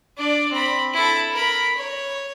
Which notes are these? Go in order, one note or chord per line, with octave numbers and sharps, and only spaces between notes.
D4 D5
C4 B5
E4 A4
A#4 B5
C#5